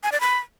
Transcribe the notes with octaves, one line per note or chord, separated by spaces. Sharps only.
G#5
D5
B5